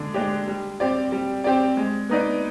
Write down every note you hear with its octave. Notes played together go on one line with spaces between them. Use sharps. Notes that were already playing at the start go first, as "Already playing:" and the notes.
Already playing: D3 G#3 D4
G#3 D4 G4
G3
C4 G4 D5
G3
C4 G4 D5
G#3
B3 D#4 B4 D5